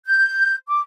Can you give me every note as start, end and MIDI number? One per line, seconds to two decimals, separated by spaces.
0.07 0.55 91
0.68 0.80 86